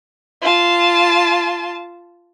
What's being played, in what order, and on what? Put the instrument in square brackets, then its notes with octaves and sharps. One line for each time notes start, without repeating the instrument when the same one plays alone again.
[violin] F4 A5